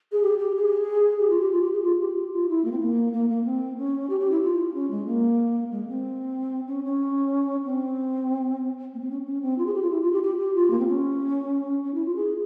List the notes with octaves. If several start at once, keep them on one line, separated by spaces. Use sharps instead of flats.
G#4
G4
G4
G#4
G4
F4
G4
F4
G4
G#4
F4
G4
G4
F4
E4
A#3
C4
A#3
A#3
A#3
C4
C#4
G4
G4
E4
F4
C#4
G#3
A#3
G#3
A#3
C4
C#4
C#4
C4
A#3
C4
C#4
C#4
C4
F4
G#4
G4
F4
E4
F4
G4
G4
G4
F4
A#3
C4
C#4
C#4
E4
F4
G#4